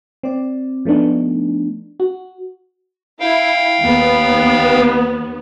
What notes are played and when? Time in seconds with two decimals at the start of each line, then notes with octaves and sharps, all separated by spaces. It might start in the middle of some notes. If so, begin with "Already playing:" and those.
0.23 C4 D5
0.85 F3 A3 B3 D4 D#4
2.00 F#4
3.20 E4 F5 G5
3.81 D#2 B3